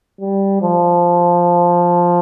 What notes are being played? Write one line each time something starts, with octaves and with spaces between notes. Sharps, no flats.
G3
F3